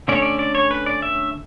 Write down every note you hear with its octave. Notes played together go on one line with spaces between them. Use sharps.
D3 A3 C#4 D5
C#5
D5
D5
C#5
B4
D5
E5